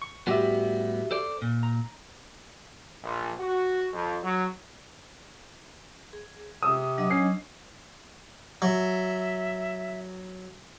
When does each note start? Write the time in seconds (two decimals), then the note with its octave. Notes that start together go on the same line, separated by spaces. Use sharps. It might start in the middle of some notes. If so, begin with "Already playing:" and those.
0.02 C#6
0.27 A2 G3 B3 F#4 G4 E5
1.11 A4 C5 D5
1.42 A#2
1.63 A#5
3.03 A#1
3.39 F#4
3.93 F2
4.23 F#3
6.13 G#4
6.63 C3 D#6 E6
6.98 F#3 D4 D#5
7.10 C#4 C7
8.62 F#3 E5